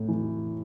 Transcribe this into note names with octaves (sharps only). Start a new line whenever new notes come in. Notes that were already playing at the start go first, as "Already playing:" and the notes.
Already playing: A2
E3